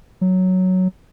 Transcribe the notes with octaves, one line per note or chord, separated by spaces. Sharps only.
F#3